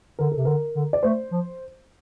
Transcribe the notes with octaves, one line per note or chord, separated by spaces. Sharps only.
D3 A#4
A4
C3
D3 A#4
D3
D5
A3 C5
F3